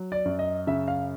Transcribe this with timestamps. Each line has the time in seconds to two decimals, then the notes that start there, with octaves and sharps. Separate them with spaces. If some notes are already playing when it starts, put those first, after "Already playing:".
Already playing: F#3
0.12 D5
0.25 F#2
0.39 D#5
0.67 C#3 E5
0.88 F5